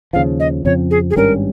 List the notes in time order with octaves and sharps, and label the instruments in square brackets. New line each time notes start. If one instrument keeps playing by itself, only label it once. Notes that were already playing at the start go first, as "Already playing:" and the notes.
[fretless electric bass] D#2 C#3 F3 [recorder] F5
[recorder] D#5
[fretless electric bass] F2 C#3 F3 C4 [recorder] C#5
[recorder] G#4
G#4
[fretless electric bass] G#1 G2 G3 C#4 [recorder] A#4